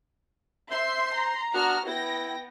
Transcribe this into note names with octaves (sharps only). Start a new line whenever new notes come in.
C5 E5 C6
A#5
B3 D4 F#4 F6 F#6
B3 E4 G5 A#6